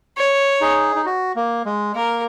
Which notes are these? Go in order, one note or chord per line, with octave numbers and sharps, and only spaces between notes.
C#5
D#4 G#4
D#4
F#4
A#3
G#3
A#3 A#4